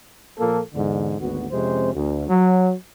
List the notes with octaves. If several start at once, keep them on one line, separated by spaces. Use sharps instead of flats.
A#2 F3 A#3 A4
E2 G#2 D3
G#1 D2 B3 F#4
F2 C3 G#3 C#4 C5
D2
F#3